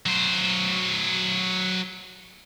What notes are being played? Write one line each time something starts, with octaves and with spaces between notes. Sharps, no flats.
F#3 C5